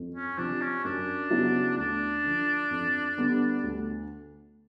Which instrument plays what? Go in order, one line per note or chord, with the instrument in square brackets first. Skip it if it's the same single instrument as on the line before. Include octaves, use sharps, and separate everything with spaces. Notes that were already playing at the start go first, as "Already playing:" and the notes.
Already playing: [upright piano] F2
[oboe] C#4
[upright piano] C3 F3 [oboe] D4
[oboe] C#4
[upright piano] F#2 [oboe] D4
[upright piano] C#3 F#3 B3 E4
[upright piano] D2 [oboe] D4
[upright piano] D3 F3
F2
D3 G3 B3
D2